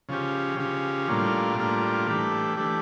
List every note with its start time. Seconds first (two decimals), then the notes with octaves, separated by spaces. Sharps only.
0.09 C#3 F3 C#4 G4
0.58 C#3 F3 C#4 G4
1.08 A2 G3 A#3 D4 F4
1.58 A2 G3 A#3 D4 F4
2.07 E3 A3 D4 G4
2.57 E3 A3 D4 G4